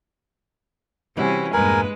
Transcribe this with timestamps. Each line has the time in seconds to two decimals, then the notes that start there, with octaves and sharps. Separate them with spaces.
1.17 C3 E3 G3 C#4 E4 F#4
1.53 E2 G2 A#2 G#3 A#4 B4 G#5